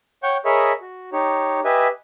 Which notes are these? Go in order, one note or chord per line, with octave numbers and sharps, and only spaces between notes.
C#5 F#5 G5 C#6 G6
G#4 A#4 C#5 D#5 E5 B5
F#4
D#4 G4 C#5
G4 B4 D#5 E5 G#5